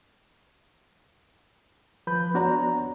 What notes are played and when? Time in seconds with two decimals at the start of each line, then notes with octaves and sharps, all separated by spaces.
2.07 F3 B4 B5 G6
2.34 B3 D4 F#4 C#5 D5 A#5